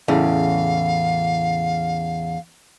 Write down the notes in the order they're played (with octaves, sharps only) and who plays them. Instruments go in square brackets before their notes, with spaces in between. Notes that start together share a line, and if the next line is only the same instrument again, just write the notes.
[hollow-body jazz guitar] E2 A2 C#3 [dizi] F5